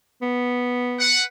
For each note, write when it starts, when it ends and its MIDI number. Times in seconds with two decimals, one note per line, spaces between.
0.22 1.17 59
0.99 1.22 71
0.99 1.22 78